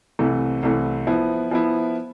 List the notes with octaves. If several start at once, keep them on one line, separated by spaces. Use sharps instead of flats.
C2 C3 E3 A3
C2 C3 E3 A3
F3 B3 E4
F3 B3 E4